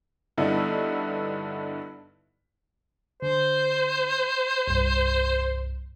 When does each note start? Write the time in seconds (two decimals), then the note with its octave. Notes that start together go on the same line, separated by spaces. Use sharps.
0.38 G2 D3 B3 D#4 E4
3.22 D3 C5
4.68 C2 G2